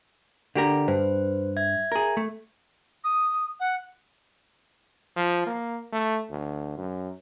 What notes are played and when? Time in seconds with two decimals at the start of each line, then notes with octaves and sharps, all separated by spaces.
0.55 D3 G4 A#4
0.88 G2 B4 C5
1.57 E5 G#6
1.92 G#4 A#4
2.17 A3
3.04 D#6
3.60 F#5
5.16 F3
5.47 A#3
5.93 A3
6.30 D2
6.78 F#2